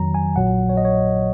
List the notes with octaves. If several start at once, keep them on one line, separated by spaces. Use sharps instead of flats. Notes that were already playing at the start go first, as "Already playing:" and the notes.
Already playing: F2 D#3 F#3 A#5
G#5
A#1 A#2 F#3 F#5
C#5
D#5
C#5